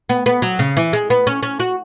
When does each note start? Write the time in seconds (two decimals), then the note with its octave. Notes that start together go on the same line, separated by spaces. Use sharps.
0.09 B3
0.26 B3
0.42 F#3
0.59 C#3
0.77 E3
0.93 G#3
1.10 B3
1.27 C#4
1.43 C#4
1.60 F#4